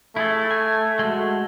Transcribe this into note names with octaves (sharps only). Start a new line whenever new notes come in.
A3 E4 G#4 A4
G#5
G#3 F#4